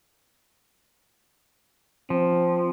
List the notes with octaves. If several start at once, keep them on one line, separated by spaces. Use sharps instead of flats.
F3 C4